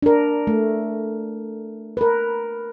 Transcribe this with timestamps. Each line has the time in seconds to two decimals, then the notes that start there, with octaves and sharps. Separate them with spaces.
0.02 D4 A#4
0.47 A3
1.97 A#4 B4